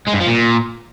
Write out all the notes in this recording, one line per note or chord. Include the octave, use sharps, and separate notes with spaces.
G#3
G2
F3
A#2